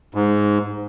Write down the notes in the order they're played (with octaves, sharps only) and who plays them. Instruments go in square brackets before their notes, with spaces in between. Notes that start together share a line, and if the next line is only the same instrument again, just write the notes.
[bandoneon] G#2